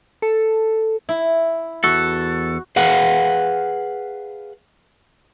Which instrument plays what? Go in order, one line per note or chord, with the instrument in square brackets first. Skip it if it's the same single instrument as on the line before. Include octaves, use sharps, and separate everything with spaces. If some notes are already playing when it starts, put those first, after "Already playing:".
[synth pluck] A4
[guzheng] E4
[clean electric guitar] E2 A4 [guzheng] F#4
[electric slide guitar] G#4 B4 F5 F#5